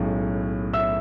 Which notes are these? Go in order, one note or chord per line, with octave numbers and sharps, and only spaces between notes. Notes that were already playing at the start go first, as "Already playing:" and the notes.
Already playing: B1 A2 G#3 C#4
E5 E6